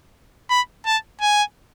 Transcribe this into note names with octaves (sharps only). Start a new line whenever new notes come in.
B5
A5
G#5